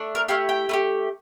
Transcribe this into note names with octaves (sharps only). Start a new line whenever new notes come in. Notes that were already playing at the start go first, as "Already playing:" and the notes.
Already playing: A3 D4
A#4
A3 E4 G4 F5
G5
A3 E4 G4